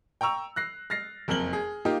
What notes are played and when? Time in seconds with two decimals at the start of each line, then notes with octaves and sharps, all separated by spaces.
0.21 G5 A#5 C#6 E6 F7
0.56 F#6 A#6 C7
0.90 F6 A6 A#6 C7
1.28 F#1 F2 A#4 F6 F#7 G7
1.53 G#4
1.85 A#3 D#4 F4 G4